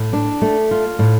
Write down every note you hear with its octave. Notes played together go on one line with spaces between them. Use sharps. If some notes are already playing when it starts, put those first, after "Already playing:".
Already playing: A2
D4
A3
F4
A2